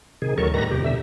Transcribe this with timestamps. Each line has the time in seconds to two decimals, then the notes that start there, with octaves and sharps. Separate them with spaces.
0.22 C3 D#3 G#4
0.38 D2 F#3 A4 A#4 C#6
0.54 A2 D#3 G3 B4 A#5 A#6
0.71 E2 C3 G4
0.84 B2 D3 E5